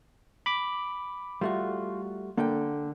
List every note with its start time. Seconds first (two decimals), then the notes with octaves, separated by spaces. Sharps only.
0.46 B5 D6
1.41 G3 A3 F4 F#4
2.37 D3 A#3 A4 G5